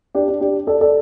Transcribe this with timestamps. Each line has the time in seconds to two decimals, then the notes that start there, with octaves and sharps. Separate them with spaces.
0.15 D4 G4
0.28 D4
0.41 D4 G4
0.67 A4 D5
0.81 A4 D5